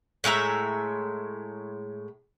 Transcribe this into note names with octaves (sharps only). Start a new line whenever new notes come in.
A2 G#3 E5 A#5